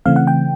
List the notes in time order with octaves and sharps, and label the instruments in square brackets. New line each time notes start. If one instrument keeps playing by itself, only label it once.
[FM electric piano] C#3 E3 A3 C4 F5
F#5
G5